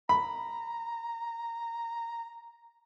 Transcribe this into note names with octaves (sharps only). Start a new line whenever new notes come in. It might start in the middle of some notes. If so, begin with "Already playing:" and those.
A#5 B5